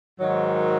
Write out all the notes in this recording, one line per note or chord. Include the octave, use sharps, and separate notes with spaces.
G#2 D#3 F#3